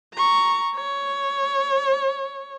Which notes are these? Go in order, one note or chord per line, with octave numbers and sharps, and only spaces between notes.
A#5 C#6
C#5